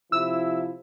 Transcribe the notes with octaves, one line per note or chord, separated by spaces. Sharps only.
C3 F3 E4 E6